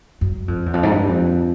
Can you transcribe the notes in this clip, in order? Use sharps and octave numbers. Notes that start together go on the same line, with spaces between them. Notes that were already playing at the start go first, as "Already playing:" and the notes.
F#2
F2
E2
F2
G#2
G2
F2